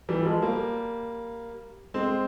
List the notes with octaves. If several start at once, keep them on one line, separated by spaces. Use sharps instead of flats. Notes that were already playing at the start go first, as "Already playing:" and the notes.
E3 G3
F3 G#3
G3 A#3
G#3 C4